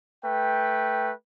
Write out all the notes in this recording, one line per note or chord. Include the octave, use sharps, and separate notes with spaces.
A3 B4 G5